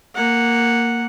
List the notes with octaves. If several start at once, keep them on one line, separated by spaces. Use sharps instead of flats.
A#3 F#5